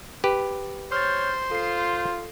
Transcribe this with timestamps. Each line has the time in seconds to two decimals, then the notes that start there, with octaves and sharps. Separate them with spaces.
0.24 G4 B4
0.92 C5 C#5 F6 G6 A6
1.51 F4 A4 C7